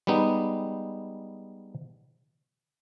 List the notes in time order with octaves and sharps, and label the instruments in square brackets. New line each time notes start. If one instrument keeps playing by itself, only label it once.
[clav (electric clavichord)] G3 G#3 B3 D#4